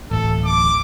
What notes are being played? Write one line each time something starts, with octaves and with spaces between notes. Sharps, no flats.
D1 A1 A4
D6